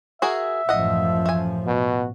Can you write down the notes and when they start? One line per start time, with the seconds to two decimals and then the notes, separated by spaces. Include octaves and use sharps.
0.22 F#4 G#4 A#4 E5
0.69 A1 F#2 F3 D#5 F#5
1.26 A3 G#5
1.67 B2 F#4